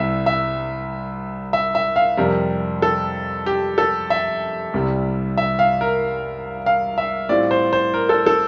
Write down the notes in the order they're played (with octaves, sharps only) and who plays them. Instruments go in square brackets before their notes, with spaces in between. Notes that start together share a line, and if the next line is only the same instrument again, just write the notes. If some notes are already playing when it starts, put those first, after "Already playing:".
Already playing: [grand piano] C2 C3 G3 E5
E5
E5
E5
F5
F2 C3 G3 A#4
A4
G4
A4
E5
C2 C3 G3
E5
F5
A#4
F5
E5
A2 G3 C4 F4 D5
C5
C5
A#4
A4
A4